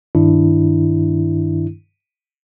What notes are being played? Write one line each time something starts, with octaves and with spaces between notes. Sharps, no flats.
G2 D#3 D4 E4